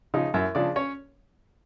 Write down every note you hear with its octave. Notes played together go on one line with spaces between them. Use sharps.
C#3 F3 D#4 D#5
F#2 E4 E5
C#3 F3 D4 D5
C#4 C#5